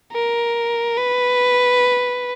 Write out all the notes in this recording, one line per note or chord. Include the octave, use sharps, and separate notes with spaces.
A#4
B4